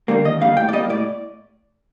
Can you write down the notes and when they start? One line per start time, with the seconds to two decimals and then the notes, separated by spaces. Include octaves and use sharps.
0.08 D3 G3 A#3
0.25 D#2 D#5
0.41 D3 G3 A#3 F5
0.57 A2 G5
0.69 D5
0.73 G3 A#3 D#5
0.89 A2 D5